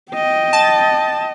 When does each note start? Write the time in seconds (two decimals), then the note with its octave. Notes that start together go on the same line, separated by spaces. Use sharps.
0.12 D#5 G5
0.53 A5